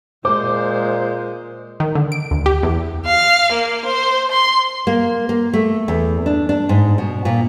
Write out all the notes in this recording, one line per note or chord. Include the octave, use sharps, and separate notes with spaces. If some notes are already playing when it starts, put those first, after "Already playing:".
A#2 G#3 C5 D6
D#3
D3
D7
D2
G4
E2
F5
A#3
C5
C6
A#3
A#3
A3
E2
D4
D4
G#2
B2
A#2